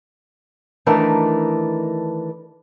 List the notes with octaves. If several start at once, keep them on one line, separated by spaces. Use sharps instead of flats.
D#3 E3 A3 D4 A#4 D5